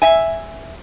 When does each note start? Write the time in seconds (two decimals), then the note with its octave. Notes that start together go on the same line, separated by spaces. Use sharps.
0.02 E5 G#5